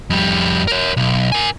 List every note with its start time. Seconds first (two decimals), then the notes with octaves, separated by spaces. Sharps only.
0.10 F2 G3
0.67 A#4 C#5
0.97 B1
1.32 A#4 G#5